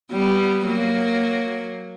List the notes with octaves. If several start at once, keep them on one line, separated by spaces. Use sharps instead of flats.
G3 B3
F#3 A#3